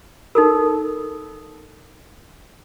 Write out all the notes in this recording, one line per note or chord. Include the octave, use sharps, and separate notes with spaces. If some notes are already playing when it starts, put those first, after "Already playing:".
D#4 A4 A#4